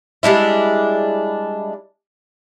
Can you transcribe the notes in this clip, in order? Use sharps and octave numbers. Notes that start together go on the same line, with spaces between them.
G3 G#3 D4 E4